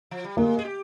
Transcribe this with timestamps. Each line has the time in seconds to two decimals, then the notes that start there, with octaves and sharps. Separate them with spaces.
0.11 F3
0.24 G3
0.37 G#3 A#3
0.59 G#4
0.65 G4